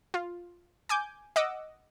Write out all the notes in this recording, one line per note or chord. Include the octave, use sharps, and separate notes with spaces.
F4
G#5 D6 G6
D#5 F#5 D6 E6